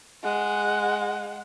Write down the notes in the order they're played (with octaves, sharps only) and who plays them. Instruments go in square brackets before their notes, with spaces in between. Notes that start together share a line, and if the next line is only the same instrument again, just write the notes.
[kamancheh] G#3 F#5